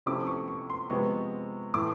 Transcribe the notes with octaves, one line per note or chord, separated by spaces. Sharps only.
C3 F3 A3 C#4 E4 D6
C#6
C#6
C6
C3 F3 G#3 B3 C#6
A2 E3 A3 D6